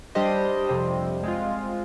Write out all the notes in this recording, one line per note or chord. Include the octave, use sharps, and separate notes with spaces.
G3 D4 G4 C5 D#5
F2 C3 G3 C4
G#3 C4 F4